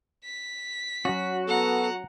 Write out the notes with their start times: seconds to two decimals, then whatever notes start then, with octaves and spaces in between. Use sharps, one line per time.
0.24 B6
1.05 F#3 C#4 F#4
1.48 B3 A4 F#5 A#5